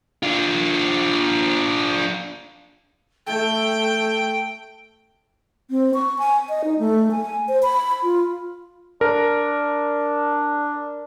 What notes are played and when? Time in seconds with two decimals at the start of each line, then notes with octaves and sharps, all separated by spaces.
0.23 D4 F4
3.27 A3 A4 G5
5.71 C4
5.94 C#6
6.19 G#5
6.49 D#5
6.64 D#4
6.79 A3
7.11 G#5
7.48 C5
7.63 B5
8.03 F4
9.01 D4 A#4